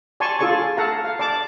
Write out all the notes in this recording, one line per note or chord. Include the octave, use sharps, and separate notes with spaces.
D5 G#5 A5 C6 C#6
F4 G#4 A4 D5 G#5 C#6
A4 F5 F#5 A#5
F5
D5 A5 D6